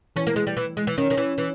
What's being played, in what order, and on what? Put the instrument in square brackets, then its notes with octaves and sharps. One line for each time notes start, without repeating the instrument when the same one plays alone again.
[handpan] E3 [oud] C#4
[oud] A#3
G#3
G3
E3
G#3
E3
[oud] D#3 [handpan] C#4
[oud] D#3
E3
E3